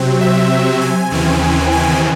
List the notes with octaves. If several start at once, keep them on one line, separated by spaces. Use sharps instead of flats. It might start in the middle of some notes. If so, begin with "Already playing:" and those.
Already playing: C3 F#3 C4
E5
G#5
D#2 C#3 E3 C4 G#5
G#5